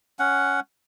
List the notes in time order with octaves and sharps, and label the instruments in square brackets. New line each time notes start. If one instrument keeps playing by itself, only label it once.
[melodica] C#4 F#5